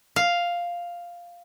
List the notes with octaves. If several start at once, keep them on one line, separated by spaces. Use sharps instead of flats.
F5